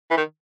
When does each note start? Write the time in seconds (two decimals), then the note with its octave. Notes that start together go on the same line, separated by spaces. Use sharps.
0.11 E3
0.17 D#3